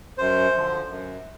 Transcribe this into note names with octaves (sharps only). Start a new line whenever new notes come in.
F#2 C5
D3 F3
F#2